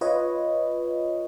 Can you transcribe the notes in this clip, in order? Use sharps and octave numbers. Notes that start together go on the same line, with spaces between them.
F4 B4 C#5 D#5